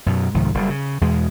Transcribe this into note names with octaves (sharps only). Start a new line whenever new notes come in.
F#2 B2
C2 G#2 D#3 F3
F#1 G3
C#3
E2 B2 G#3